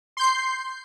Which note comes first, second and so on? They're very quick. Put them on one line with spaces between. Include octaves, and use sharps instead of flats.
C6 G6 C7